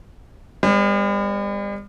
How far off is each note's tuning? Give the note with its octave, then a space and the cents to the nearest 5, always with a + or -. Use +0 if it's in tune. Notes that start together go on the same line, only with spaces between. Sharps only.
G3 +45 B3 +30 C#5 +0